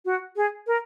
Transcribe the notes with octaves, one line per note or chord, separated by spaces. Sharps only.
F#4
G#4
A#4